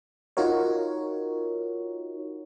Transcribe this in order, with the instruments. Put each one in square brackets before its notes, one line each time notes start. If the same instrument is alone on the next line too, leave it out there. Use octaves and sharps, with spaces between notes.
[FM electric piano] D#4 F4 F#4 A#4 C#5